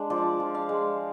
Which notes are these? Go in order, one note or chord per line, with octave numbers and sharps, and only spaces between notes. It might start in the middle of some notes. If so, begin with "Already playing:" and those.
Already playing: G#3 D4
F3 D5
F3
F5
G#3